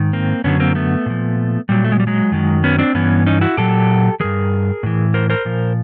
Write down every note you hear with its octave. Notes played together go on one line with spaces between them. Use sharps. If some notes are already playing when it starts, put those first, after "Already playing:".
Already playing: G#2 D#3
A#3 C4
F#2 D3 F#3 B3 C#4
A#3 C4
A3 B3
A#2 F3
A#2 F#3 G3
A3
G#3
G3
F#3 G#3
F#2 D#3 F#3
B3 C#4
C4 D4
G2 E3 B3 C#4
C#4 D#4
E4 F#4
A#2 F#3 G4 A4
G2 E3 G#4 A#4
A2 E3
A#4 C5
A#4 C5
A#2 F3